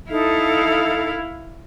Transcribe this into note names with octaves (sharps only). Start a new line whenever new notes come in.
D#4 E4 A4 F5